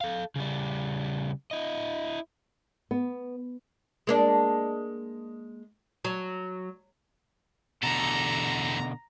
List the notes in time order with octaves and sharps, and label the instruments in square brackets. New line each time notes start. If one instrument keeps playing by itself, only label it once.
[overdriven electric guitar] A4 F5
C#3 G3
E4 D#5
[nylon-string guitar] B3
[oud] G#3 A#3 D4
F#3
[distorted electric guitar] E2 A4 [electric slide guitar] B2 D3 [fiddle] A#5